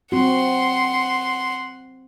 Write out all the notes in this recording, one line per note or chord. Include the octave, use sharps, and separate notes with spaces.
C4 F#4 F#5 C6